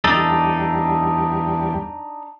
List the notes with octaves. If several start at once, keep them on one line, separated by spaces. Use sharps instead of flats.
E2 G3 D4 D#4 A4